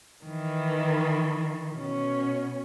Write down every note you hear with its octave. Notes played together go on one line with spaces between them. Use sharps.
D#3 E3
B2 C#4